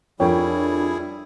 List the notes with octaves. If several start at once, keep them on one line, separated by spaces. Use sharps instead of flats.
F2 G3 D4 E4 G#4 A#4 C#5 G5